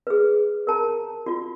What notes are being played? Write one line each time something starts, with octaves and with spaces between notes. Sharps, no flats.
G#4 B4
A#4 A5 A#5
F4 F#4